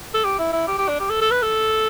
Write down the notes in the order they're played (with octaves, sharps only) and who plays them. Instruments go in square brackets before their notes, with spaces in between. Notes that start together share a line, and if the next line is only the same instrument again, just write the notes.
[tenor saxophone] A4
G4
E4
E4
G4
G4
D4
G4
A4
A4
B4
A4